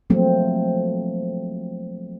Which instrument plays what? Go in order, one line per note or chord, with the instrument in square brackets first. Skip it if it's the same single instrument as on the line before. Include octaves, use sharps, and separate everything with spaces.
[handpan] F3 F#3 A3 A#3 C4